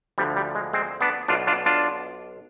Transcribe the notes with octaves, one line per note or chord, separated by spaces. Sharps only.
D2 D3 F3 G3
G3
G#3
G#3 C4
B3 D4
B1 B2 D4 F4
D4 F4
D4 F4